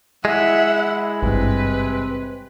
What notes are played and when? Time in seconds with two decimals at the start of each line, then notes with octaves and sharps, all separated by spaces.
0.25 G#3 E4 E5 F#5
1.23 G#1 G2 C3 C4 B4